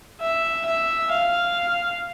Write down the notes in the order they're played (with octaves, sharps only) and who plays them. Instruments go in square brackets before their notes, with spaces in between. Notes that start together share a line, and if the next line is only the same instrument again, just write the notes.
[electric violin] E5
E5
F5